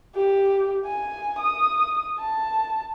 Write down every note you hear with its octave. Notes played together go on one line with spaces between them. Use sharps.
G4
G#5
D#6
A5